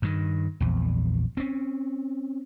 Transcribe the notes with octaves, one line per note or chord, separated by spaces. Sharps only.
G2 D#3
A#1 E2
C4 C#4